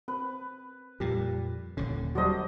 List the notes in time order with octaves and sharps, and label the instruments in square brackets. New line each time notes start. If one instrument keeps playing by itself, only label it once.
[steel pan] C4 [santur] B4
[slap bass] F2 A#2 [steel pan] G3 G4
[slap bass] D#1 D#2 D3 [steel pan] C#4
[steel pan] F#3 G3 F#4 [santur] D4 C5 D#5